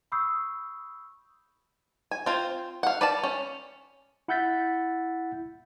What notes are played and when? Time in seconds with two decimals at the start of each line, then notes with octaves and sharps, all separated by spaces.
0.12 B5 C#6 D#6 E6 G6 C7
2.11 G#5
2.26 C4 F4 C5
2.83 F5 F#5
3.01 B4 D5 F5 A5
3.24 C#4
4.28 E4 F#5 E6 G6 A6 B6